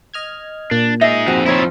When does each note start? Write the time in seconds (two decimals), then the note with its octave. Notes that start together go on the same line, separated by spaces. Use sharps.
0.14 D#5 F6 G#6
0.71 A#2 D4
1.01 D#4 G#4 D#5 E5
1.28 F2 C4 F#4
1.46 F3 D#4 E4 C#5